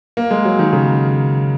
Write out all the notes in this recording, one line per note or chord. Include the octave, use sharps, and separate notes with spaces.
A#3
G#3
F#3
D#3
C#3